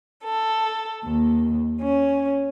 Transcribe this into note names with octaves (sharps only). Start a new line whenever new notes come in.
A4
D#2
C#4